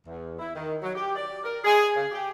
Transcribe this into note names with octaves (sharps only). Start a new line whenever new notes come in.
E2
E4
D#3
F#3
G4
D5
A#4
G#4
C#3
G4